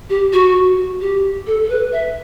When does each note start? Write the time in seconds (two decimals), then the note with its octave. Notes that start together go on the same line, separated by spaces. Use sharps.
0.10 G4
0.33 F#4
1.01 G4
1.47 A4
1.64 A4
1.70 B4
1.92 E5